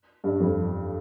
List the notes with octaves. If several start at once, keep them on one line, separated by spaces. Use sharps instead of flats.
G2
F2